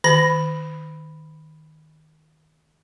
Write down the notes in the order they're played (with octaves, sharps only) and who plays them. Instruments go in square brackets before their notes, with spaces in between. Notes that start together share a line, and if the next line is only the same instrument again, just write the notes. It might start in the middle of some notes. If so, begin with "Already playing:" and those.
[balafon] D#3 [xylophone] B5 A#6